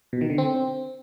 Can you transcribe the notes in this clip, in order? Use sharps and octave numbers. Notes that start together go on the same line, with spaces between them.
B2
D#3
D3
C4